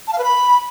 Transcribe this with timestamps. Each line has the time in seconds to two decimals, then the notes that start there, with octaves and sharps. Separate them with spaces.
0.07 A5
0.13 F5
0.18 B4
0.24 B5